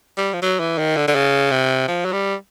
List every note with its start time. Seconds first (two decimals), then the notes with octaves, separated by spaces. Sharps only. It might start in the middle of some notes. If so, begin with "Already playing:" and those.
0.17 G3
0.34 F3
0.42 F#3
0.60 E3
0.78 D#3
0.97 D3
1.08 D3
1.15 C#3
1.51 C3
1.88 F3
2.05 F#3
2.13 G3